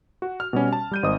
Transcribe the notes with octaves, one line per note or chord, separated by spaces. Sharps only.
F#4
F6
B2 G3 C#4
A5
G3 G6 D#7
G#1 C5 D#5 D#6